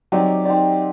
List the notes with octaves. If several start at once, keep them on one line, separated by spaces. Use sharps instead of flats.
F#3 C4 D#4 G4 D5
C4 D#4 G4 D5